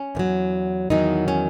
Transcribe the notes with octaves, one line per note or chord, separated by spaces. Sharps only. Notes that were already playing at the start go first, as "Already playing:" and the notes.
Already playing: C#4
E2 D#3 F#3
E2 D#3 F#3 D#4
C#4